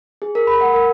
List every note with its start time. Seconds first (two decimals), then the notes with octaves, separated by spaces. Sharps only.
0.22 G#4
0.35 A#4
0.47 B5
0.61 F#5
0.73 A#4